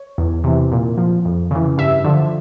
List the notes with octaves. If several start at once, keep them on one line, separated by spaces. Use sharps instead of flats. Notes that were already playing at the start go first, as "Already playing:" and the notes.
Already playing: C#5
E2
C3 E3
A#2
F3
F2
C#3 E3
G2 E5
D3 F3